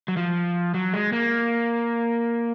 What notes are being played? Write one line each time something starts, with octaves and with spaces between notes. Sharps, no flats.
F#3
F3
F#3
G#3
A#3